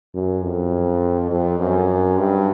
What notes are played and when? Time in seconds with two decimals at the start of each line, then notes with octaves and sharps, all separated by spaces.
0.15 F#2
0.43 F2
1.31 F2
1.60 F#2
2.18 G2